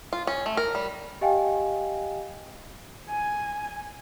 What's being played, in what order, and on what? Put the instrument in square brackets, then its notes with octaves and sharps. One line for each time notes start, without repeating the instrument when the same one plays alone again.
[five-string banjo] F4
C#4
A3
A#4
G3
[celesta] G4 D#5 F5 G5 G#5
[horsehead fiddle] G#5